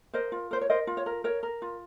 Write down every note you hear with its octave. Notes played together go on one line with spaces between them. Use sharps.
A#4 C5 D#5
F4
A#4 C5
C#5
A#4 C5 D#5
F4
C#5
A#4
A#4 C#5
A#4
F4